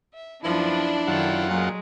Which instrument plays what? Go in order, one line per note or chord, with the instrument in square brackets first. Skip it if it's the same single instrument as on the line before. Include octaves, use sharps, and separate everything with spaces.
[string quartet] E5
[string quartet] F#2 F3 B3 [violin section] D4 [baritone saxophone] E4
[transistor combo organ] F#2 F4 F#5 [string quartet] D#3 A4 G5
[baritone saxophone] A#2 [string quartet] F#3 G#3